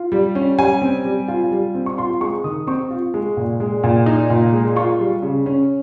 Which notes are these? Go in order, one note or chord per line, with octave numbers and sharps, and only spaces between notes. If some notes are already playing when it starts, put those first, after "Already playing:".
Already playing: F4
G3
C#4
G3 G#5
C4
G3
F4
G3
C4
C#6
F4 C6
G#3 C#6
D#3 D#6
C4 C#6
F4
G#3
A#2
G#3
A#2
D#4
A#2
G#3
F4 C#6
G3
C#3
C#4